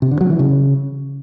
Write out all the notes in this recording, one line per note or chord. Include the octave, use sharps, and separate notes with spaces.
C3
D3
F#3
E3
C#3